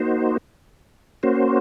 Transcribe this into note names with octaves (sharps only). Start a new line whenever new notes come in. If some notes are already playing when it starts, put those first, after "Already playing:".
Already playing: A#3 D#4 F#4 C5
A#3 C#4 F#4 C5